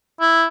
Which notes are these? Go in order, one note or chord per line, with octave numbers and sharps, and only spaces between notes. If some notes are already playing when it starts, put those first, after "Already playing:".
E4